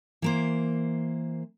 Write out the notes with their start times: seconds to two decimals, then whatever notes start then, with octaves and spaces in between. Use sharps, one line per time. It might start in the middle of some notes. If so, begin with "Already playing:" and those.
0.22 E3 A#3 C5